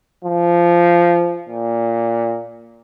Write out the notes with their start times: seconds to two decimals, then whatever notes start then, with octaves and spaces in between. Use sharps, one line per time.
0.24 F3
1.49 A#2